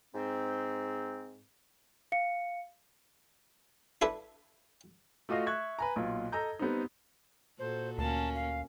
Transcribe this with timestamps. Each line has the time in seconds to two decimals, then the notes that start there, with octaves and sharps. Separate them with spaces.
0.15 G#2 C4
2.12 F5 C#7
4.02 D4 E4 A4 B4
5.29 A3 F4 F#4 D#5 F5
5.46 E5 C#6 F#6 G#6
5.79 B4 G#5 A#5
5.96 B1 A#2 F4
6.32 A4 D#5 A#5 G6
6.59 G3 B3 C4 D#4
7.59 A#2 F#4 A4 C5
7.98 D2 A#3 C#4 A5
8.35 F5